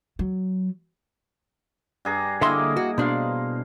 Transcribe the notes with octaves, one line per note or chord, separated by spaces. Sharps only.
F#3
G2 G#4 A#5
D3 A#3 E4 D#5 E5 C6
F#4
B2 D4 C5 F5